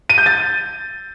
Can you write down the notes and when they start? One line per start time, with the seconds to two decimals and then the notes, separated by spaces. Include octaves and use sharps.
0.10 D#7
0.18 G6
0.26 A6